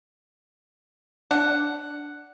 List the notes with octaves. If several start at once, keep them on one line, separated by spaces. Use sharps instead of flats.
D4 F#5